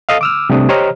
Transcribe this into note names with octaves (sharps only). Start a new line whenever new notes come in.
A4 D#5 F5
D6 E6 F6
C3 G3 A3 D4 D#6
G4 C5 C#5 D#5 A#5 F6